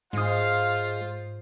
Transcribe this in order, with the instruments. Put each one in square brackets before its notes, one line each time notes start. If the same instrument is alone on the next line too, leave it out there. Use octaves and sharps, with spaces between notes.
[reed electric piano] G#2 D#6 [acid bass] G#3 [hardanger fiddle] F4 C5 [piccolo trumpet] F5